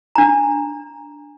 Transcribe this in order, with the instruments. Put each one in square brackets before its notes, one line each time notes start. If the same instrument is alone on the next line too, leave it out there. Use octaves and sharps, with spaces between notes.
[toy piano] D4 A#5